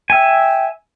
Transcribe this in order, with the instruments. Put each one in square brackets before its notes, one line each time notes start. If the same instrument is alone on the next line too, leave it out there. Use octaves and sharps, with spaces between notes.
[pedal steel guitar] E5 G#5 [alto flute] G5